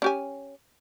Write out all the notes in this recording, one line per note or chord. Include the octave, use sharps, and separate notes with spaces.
C#4 G4 G#5